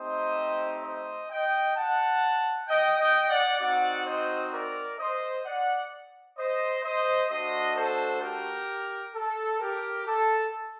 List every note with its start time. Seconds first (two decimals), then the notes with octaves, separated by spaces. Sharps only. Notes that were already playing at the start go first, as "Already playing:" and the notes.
Already playing: A3 C4 D#4 G4 C5 D#5
0.83 C5 D#5
1.30 D#5 G5
1.75 F#5 A5
2.68 D#5 G5
2.98 D#5 G5
3.29 D5 F#5
3.60 C4 D#4 F#4 D5 F#5
4.06 C5 D#5
4.52 A#4 D5
4.99 C5 D#5
5.46 D5 F#5
6.37 C5 D#5
6.84 C5 D#5
7.30 A3 D4 F#4 C5 D#5
7.76 A4 C5
8.21 G4 A#4
9.15 A4
9.60 G4 A#4
10.06 A4